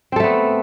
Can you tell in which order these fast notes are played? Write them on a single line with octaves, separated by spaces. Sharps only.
C4 A4 A3 B3